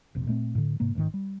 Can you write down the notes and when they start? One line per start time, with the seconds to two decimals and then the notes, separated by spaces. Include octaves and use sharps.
0.15 F1 A#1 C3
0.27 A#2 A3 B3 C4
0.55 A2 D3
0.80 G#2 C3 A#3
0.95 A1 G#2 D3 D#3
1.14 G3